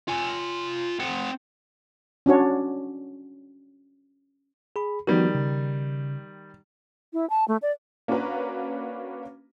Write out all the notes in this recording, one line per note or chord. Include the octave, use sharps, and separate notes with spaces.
F4 G#5
C4 F#5
C#4 D4 F#4 C#5
G#4 B5
D#3 F3 G3 B3 F#4
C#3
E4
A5
A3
D5
A#3 C#4 D4 F#4 B4 A#5